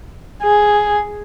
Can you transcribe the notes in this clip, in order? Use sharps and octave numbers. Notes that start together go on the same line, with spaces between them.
G#4